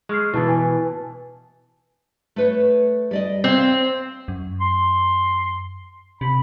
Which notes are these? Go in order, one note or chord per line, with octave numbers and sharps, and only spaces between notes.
G#3 C#6 F6 C7
B2 E3 E4 A5 A6
B4 G#5 A5
A3 B4 C#5
G3 D5 D#5
C4 C#5 F5
F#2
C6
C3 B5